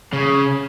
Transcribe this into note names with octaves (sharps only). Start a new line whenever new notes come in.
C#3